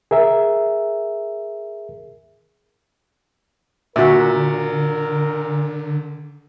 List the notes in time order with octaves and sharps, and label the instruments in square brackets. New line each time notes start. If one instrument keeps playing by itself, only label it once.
[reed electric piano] G#4 A#4 E5
[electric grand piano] A#2 [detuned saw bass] D3 [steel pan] F#4 E5 [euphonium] A#4